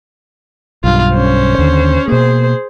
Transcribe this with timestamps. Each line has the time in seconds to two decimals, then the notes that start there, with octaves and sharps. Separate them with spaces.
0.84 B1 G2 F4
1.13 C#4 C5
1.58 D#2 D3
2.08 B2 A#3 G#4 C5